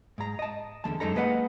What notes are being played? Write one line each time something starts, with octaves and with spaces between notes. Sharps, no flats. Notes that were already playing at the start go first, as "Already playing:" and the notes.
G#2 A#5
D#5 A5
E2 D3 G#3 A5
F#2 G#3 D#4 A4 A#5
G#3 A#3 B4 D#5 F#5